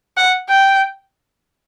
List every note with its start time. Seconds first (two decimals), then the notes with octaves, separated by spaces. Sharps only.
0.17 F#5
0.49 G5